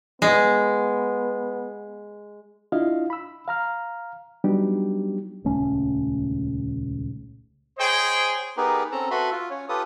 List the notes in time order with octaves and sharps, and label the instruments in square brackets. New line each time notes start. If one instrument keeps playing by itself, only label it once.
[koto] G#3 [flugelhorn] B3
[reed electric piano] D4 E4 F4 D#5 F5
B5 E6
F5 A#5 F6
F#3 G3 B3 D4 D#4 G4
[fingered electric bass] D#1 C#2 A3 C#4
[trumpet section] G#4 C5 C#5 D#5 G5
[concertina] B3 D#4 G4 G#4 A#4 B4
C4 C#4 A4 A5 A#5
F#4 A4 B4 E5 B5 C6
F4
C#4 C#5
F4 G4 A4 B4 D#6